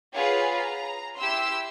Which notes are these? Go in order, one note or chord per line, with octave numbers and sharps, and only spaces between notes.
F4 G#4 B4 C#5 F5 F#5
A#5
E4 G4 C6 E6